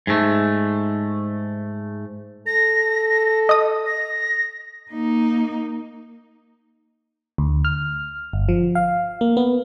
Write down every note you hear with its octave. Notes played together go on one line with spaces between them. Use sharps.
G#2 A3
A4 A#6
D#5 D#6
A#6
A#3 D#4
D2
F6
G1
F3
F5
A#3
B3